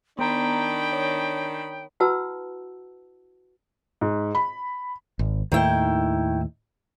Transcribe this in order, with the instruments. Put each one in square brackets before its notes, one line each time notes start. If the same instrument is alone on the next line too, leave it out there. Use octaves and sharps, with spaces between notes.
[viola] D#3 B5 [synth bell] B3 A#5 [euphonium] D4 [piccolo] G5
[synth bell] C#5
[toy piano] E4 F#4 B4 F#5 A5 E6
[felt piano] G#2
B5
[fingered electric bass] G#1
[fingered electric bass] D#2 A2 [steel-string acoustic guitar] D#3 E4 G5